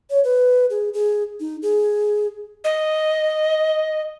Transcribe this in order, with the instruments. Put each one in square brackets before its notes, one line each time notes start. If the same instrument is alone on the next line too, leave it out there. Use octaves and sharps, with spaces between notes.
[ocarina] C#5
B4
G#4
G#4
D#4
G#4
[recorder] D#5